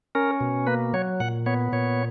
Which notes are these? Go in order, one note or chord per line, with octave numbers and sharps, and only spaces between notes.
C#4 A#4
B2
A#3 B4
F#3 C#5
A#2 F#5
B3 C#5
A#2 C#5